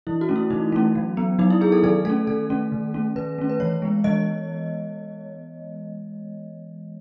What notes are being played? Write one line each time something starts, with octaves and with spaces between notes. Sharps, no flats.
E3 E4
F#4
A3 C#4
E4
E3 D#4
A3 C#4
F#3
B3
F#3 D#4
E4
B3 G#4
A4
D#3 A4
A3 C#4 A4
D#3 A4
A3 C#4
D#3
A3 C#4
D#3 B4
A3 C#4
B4
E3 C#5
G#3 B3
E3 D#5